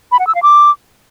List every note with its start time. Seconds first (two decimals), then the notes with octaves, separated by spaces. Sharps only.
0.12 B5
0.19 F#5
0.27 E6
0.35 F5
0.43 D6